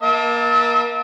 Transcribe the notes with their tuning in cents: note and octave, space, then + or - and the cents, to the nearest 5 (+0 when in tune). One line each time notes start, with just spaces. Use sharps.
A#3 +25 E5 -35 A5 +10